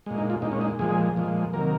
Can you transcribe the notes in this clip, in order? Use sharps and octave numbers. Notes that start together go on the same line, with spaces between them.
A#2 G#3
D#4
F4
A#2 G#3 D#4
C#4
D#4
A#2 F3 G#3 G#4
A#2 F3 G#3
C3 D#3 F#3 A#3 A#4